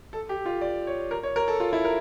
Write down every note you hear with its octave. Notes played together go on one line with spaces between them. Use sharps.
A4
G4
F4
D5
C#5
A#4
C#5
A#4
A4
F4
E4
A#4